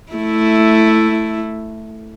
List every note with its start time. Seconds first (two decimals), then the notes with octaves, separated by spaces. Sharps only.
0.12 A3 E4